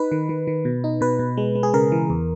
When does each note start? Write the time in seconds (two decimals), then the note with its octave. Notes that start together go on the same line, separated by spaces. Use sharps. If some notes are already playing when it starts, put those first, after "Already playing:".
Already playing: D#4 B4
0.12 D#3
0.29 D#3
0.47 D#3
0.65 B2
0.84 D#4
1.01 B2 B4
1.19 B2
1.37 G#3
1.55 G#3
1.63 G#4
1.74 C#3 A#4
1.92 E3
2.10 E2